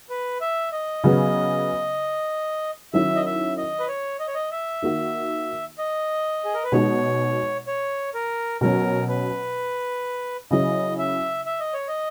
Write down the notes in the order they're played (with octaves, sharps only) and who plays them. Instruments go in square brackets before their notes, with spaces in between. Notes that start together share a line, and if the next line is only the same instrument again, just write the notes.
[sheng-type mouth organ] B4
E5
D#5
[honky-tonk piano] C#3 F#3 B3
[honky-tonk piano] D#3 F#3 C#4 E4 [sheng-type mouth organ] E5
[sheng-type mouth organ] D#5
E5
D#5
B4
C#5
D#5
C#5
D#5
E5
[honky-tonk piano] D#3 A#3 D#4 F#4
[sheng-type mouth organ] D#5
G#4
A#4
B4
[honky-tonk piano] B2 G#3 D#4 F#4 [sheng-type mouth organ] C#5
[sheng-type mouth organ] C#5
A#4
[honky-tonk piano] B2 F#3 C#4 [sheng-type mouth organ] A#4
[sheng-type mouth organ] B4
[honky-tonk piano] C#3 F#3 C#4 E4 [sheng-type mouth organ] D#5
[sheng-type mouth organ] E5
E5
D#5
C#5
D#5